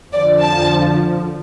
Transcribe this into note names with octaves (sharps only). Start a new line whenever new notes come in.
F2 D3 F3 D5
A5